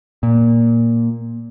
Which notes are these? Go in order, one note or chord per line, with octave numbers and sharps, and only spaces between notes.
A#2